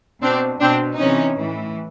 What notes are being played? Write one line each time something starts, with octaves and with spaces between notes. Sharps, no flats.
B2 C4 D4
B2 C4 D4
C3 E3 C#4 D#4
A2 E3